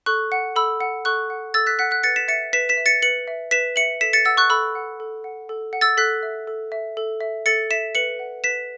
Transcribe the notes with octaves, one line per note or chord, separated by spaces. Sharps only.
A4 C#6 F#6
F#5
A4 B5 E6
F#5
A4 C#6 F#6
F#5
A4 E6 A6
F#6 B6
F#5 F#6 B6
F#6 B6
B4 A6 C#7
B6 E7
E5 A6 C#7
B4 B6 E7
B6 E7
E5
A6 C#7
B4 C#7 F#7
E5
B4 B6 E7
E5 C#7 F#7
A4 B6 E7
A6 C#7
F#5 E6 A6
C#6 F#6
A4 B5 E6
F#5
A4
F#5
A4
F#5
E6 A6
A4 F#6 B6
E5
A4
E5
A4
E5
A4 A6 C#7
E5 B6 E7
B4 C#7 F#7
F#5
B4 B6 E7